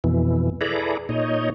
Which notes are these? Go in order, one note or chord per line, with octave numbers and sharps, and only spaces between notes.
F2 B2 E3
E4 G#4 A4 B4 D5 A#5
A#2 D#4 C#5 D#5